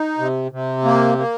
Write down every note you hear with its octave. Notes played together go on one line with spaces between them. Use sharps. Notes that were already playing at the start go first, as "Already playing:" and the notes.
Already playing: D#4
C3
C3
A#3
A#3